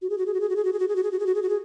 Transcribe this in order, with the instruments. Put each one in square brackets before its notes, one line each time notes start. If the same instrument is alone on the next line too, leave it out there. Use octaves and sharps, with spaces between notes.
[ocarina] F#4
G#4
F#4
G#4
F#4
G#4
F#4
G#4
F#4
G#4
F#4
G#4
F#4
G#4
F#4
G#4
F#4
G#4
F#4
G#4